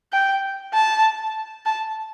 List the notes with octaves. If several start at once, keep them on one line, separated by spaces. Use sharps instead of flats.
G5
A5
A5